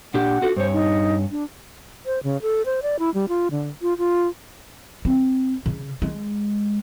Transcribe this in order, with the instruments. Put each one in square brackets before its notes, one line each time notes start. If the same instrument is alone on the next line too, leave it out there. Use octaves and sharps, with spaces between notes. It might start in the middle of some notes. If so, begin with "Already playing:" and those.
[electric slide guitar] A#2 D4 G4 [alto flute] F#5
[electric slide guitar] F4 F#4 A4
[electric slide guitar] G2 C#5 [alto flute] C5
[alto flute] D#4
D4
[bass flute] C5
C#3
A4
C5
D5
E4
G3
F4
D3
F4
F4
[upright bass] C4
C#3
G#3